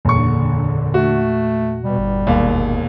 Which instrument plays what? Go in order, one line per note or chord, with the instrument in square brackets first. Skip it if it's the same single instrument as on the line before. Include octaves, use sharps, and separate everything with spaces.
[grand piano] F#1 C#6 [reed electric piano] E2 A#2 [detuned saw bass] D3
[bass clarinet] A3 [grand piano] F#4
[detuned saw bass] B2 [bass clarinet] G3
[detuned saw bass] G1
[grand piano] E1 D#2 F5